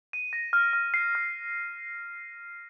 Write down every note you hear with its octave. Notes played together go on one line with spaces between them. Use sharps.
D#7
A#6
F6
F6
C7
F6